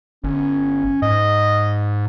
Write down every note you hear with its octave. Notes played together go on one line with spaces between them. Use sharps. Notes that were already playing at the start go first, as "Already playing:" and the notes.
G1 C#4
G#2 D#5